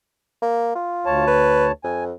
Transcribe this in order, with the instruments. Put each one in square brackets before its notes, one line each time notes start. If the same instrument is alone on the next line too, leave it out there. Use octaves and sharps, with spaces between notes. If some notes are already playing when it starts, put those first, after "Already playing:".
[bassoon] A#3
F4
[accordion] D2 C#5 A5
[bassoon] B4
[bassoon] F2 [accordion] G#5